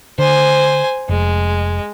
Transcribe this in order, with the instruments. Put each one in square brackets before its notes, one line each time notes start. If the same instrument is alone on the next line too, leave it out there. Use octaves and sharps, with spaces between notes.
[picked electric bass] D3 [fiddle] C5 G#5
[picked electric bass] F1 [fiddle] G#3